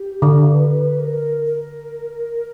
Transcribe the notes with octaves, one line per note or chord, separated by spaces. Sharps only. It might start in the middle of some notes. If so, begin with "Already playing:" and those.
Already playing: G4
D3
B4
A#4
A#4